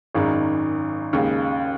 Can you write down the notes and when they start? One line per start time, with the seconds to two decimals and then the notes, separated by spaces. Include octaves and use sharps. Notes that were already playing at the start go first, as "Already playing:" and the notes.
0.15 G#1 F#2 D#3 G#3 D#4
1.13 D#2 C#3 G#3